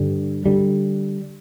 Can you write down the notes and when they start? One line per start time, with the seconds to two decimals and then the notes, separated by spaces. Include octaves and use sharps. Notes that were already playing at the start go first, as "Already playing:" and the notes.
Already playing: G2 D3 G3
0.46 D3 G3